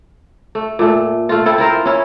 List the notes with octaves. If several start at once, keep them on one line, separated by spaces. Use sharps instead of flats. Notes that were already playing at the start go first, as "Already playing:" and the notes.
A3
A#2 A3
A3 F4
C4 E4 A4
E4 F4 A#4 C5
C#4 E4